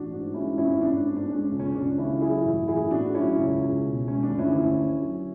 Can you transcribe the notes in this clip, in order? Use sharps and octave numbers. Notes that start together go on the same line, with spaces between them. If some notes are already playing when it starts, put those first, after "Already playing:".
Already playing: A1 D4 F#4
G#2
G#3 C#4 E4
G#1 C#4 E4
G#1 D4
D4
G#2 D4
D4
G#3 C#4
C#4
C#2
C#4
C#2 D4
C#3 C#4 E4
F#3 E4 G#4
A1
A1 E4 G#4
A2 D4 F#4
F#3 C#4 E4
C#2
C#2
B2
G#3 C#4
D4
D2
C#4 E4
D2
D3
F#3